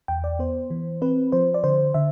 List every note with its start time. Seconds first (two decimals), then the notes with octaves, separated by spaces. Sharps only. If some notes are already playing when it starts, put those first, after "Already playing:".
0.08 E2 G5
0.24 D5
0.39 B3 C5
0.70 E3
1.02 C4 B4
1.32 F3 C5
1.54 D5
1.64 D3 C5
1.94 D3 E5